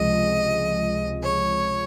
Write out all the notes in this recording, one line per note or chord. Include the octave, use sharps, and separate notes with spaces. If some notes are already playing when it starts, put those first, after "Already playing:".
Already playing: C#2 C3 F3 G#3 D#5
C#5